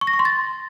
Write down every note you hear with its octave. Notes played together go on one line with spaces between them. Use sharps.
C#6
A#6
C#6
C6
A6